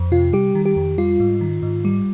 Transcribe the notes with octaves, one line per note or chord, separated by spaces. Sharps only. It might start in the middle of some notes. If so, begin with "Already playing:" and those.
Already playing: F2
C3 F4
G3 G4
D#3
G4
F2
G3 F4
G#2
D#3
G#2
G3